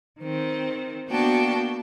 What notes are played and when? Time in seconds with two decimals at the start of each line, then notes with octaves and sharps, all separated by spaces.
0.20 D#3 C4
1.08 A#3 B3 D4 F#4 G5 A5